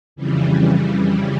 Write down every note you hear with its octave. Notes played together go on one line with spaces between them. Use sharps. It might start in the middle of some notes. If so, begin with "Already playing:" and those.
F2 C#3 E3 G3